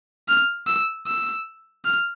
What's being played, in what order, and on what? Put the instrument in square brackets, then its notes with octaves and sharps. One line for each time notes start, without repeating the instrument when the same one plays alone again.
[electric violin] F6
E6
E6
F6